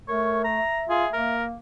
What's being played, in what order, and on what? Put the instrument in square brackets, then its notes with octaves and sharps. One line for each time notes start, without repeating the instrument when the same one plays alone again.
[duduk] A3 [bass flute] A#4 [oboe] C#5
[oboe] A#5
[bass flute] E5
[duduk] F4 [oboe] G#4
[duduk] A#3 [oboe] A#4